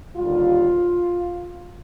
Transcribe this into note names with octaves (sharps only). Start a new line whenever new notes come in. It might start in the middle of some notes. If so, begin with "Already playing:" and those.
D#2 D3 G3 F4